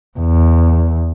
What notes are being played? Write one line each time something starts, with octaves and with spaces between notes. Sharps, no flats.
E2